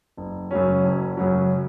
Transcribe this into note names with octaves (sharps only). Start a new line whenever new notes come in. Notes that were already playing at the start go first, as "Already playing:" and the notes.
F#1
F#2 C#3 F#3 C#4
F#1
F#2 C#3 F#3 C#4